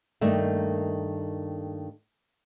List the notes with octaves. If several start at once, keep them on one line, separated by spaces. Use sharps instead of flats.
G2 D#3 A3 A#3 E5